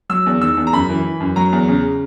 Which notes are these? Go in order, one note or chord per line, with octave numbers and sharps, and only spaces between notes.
F#3 E6
E2
D#3 E6
E2
A#5
F#2 B5
E3
E3
F#2
F#3 A#5
E2
C#3